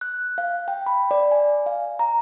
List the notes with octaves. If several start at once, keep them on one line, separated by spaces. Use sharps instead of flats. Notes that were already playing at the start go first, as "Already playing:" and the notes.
F#6
F5
G5
B5
D5
G#5
F5
A#5